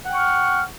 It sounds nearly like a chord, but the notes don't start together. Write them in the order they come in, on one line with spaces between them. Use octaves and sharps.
F#5 G5 C#6 F6